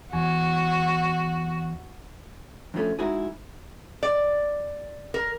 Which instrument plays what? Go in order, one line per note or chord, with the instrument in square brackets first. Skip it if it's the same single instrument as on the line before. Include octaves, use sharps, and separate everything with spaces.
[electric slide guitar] E2 G#5 [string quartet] F#4
[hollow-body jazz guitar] F2 D3 F3 A3 C#4
G#3 D#4 E4 F#4 G#4
[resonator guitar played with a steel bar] D5
A#4